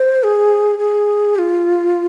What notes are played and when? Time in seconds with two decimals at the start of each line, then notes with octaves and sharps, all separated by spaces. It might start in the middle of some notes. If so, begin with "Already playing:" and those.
Already playing: C5
0.23 G#4
0.79 G#4
1.35 G4
1.39 F4